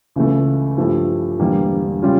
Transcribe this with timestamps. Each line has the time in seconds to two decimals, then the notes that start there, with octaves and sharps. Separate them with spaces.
0.16 C#2 C#3 E3 A3
0.78 G2 F3 A3 E4 G4
1.39 E1 E2 D3 G3 A#3
2.03 C#3 G3 C#4 F4